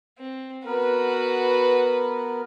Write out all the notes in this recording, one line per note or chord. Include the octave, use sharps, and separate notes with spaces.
C4
B3 F#4 A#4 B4